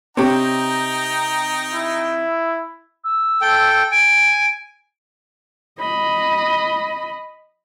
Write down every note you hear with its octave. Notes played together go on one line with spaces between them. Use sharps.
C3 C4 D#4 G4 C#5 G5 A#5
E4
E6
A4 G5
G#5 D7
D#5 B5